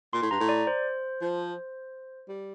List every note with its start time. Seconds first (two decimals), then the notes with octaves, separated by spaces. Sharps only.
0.13 A#2 C6
0.22 A2
0.31 G2 A#5
0.40 A2
0.49 D5
0.67 C5
1.21 F3
2.29 G3